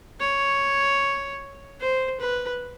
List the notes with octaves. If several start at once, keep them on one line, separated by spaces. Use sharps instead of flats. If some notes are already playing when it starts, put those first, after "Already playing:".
C#5
C5
B4